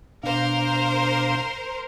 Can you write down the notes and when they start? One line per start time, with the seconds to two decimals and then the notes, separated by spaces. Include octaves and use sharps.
0.23 B2 D4 A#4 C5 F5